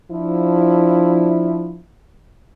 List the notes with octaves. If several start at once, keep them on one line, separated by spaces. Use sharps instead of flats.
F3 D4 E4